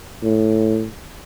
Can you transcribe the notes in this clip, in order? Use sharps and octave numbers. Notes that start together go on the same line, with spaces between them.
A2